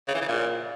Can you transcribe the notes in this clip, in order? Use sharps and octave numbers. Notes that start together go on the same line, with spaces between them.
C#3
E3
C#3
A#2